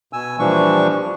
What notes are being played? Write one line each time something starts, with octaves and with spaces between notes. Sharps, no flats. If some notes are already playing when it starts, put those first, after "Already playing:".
B2 G#5 E6
A#2 E3 F3 G3 D4 C#6